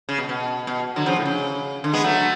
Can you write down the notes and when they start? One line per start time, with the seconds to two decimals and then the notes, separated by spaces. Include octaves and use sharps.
0.09 C#3
0.18 B2
0.29 B2
0.67 B2
0.96 D3 F#3
1.06 C#3 F3
1.16 A2
1.25 C#3
1.84 D3
1.93 G#3 B3
2.04 F#3 A3